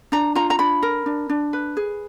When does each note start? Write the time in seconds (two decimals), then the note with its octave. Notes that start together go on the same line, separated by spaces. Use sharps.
0.12 D4 A#5
0.35 F4 A#5
0.50 A#5
0.59 D4 B5
0.83 A#4
1.06 D4
1.30 D4
1.53 B4
1.77 G#4